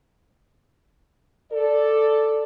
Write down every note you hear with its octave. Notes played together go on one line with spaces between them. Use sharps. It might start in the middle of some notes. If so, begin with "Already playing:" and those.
A4 D5